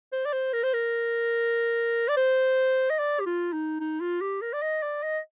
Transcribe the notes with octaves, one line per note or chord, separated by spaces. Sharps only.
C5
D5
C5
A#4
C5
A#4
D5
C5
D#5
D5
G4
F4
D#4
D#4
F4
G4
A#4
D5
D#5
D5
D#5